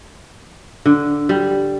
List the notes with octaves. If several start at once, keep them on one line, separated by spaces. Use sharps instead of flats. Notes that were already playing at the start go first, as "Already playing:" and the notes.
D3
G3